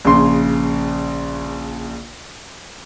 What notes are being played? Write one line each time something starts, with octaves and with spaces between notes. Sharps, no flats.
A#1 C#3 C6